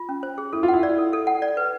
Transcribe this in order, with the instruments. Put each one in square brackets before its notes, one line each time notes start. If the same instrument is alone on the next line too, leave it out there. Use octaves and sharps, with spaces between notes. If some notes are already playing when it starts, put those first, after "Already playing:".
Already playing: [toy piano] F4
C#4
C5
G#4
[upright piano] E4 [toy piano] A4
[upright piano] F4
[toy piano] F#5
[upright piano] E4
[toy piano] D5
A4
A4
F#5
D5
B4